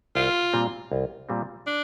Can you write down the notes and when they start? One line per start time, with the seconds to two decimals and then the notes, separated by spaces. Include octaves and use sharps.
0.15 C2 F4
0.53 A#2 G3 C4
0.92 C2
1.29 A#2 G3 C4
1.67 D4